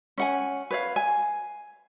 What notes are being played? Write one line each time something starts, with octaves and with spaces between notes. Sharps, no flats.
C#4 F#5 G#5
B4 C#5 F5
G#5